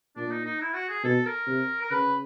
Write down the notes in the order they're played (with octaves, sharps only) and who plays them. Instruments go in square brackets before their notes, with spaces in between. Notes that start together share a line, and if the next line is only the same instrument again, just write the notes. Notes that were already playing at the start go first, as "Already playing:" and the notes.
[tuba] A#2 [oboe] D4
[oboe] D#4
D#4
E4
F#4
G#4
[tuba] B2 [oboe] A4
[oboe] A#4
[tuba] C3
[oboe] A#4
[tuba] C#3 [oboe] B4